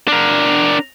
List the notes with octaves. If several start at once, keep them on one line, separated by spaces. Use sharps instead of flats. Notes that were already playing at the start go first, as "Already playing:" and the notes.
D4 A#4